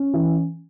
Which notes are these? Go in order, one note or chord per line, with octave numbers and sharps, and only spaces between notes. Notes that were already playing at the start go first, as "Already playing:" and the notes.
Already playing: C#4
E3